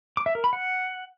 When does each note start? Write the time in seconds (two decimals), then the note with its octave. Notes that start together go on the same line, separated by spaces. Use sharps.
0.17 D6
0.26 E5
0.35 A#4
0.44 B5
0.53 F#5